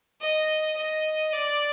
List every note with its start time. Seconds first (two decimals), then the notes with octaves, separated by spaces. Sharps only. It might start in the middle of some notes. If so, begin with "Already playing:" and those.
0.21 D#5
0.77 D#5
1.32 D5